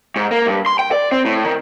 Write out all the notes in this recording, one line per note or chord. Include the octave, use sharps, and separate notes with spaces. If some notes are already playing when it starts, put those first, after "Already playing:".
G#2
A#3
G2
C6
G5
D5
C4
A2
D#3